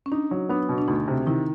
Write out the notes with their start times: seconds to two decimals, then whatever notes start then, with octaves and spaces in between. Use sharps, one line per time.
0.06 C#4
0.12 D4 D#4
0.31 F#3
0.49 B3 D4
0.69 B2
0.78 D4
0.88 D2 D#4
1.08 C3
1.26 D#3 E4